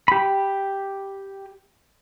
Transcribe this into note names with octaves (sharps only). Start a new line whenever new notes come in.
G4 B5